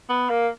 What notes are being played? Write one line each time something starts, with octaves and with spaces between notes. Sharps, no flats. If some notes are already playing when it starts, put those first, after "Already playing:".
B3
A#3